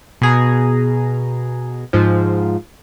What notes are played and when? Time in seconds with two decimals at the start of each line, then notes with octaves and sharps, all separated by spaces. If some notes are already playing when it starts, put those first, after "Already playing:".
0.21 B2 G#4 A#5
1.93 G#2 F3